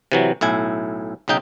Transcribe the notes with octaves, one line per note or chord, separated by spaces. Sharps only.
C3 E3 F#3
B1 A2 E4 G#5
B1 C#3 D#4 G5